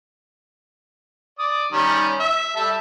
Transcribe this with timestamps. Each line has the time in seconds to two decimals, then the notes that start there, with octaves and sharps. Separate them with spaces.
1.39 D5 D#6
1.72 D#3 G3 C#4
2.20 E5
2.56 G3 A4 E5